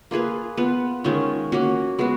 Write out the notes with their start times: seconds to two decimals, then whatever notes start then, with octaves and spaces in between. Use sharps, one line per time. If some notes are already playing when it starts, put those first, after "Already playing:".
0.11 A#3 F4 G#4 B4
0.57 B3 F4 B4
1.04 D#3 G#3 C#4 F4
1.52 A#3 C#4 F#4
1.99 G#3 B3 F#4